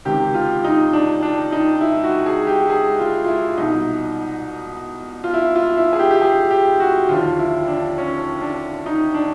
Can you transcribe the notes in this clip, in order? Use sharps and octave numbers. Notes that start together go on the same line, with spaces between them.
C#2 C3 D#3 G4
F4
D#4
D4
D4
D#4
E4
F#4
G#4
G4
G#4
F4
F4
E4
C2 B2 D#4
F4
E4
F4
E4
G#4
G4
G4
G#4
G4
F#4
D#2 D3 F3 F4
E4
D4
C#4
D4
D#4
D4